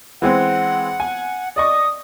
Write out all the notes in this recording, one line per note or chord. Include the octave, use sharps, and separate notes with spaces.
E3 G#3 C4 F#5
G#5
D5 D#5 C#6 D#6